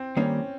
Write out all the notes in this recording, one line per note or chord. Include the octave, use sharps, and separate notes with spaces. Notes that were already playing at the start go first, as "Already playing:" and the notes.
Already playing: C4
D#3 G3 A#3 C#4